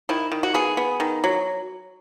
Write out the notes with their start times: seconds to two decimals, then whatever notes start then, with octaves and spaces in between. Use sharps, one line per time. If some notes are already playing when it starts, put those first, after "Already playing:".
0.09 D#3 E4
0.32 D#3
0.43 F#4
0.54 B3 G#4
0.77 B3
1.00 D#3
1.24 F#3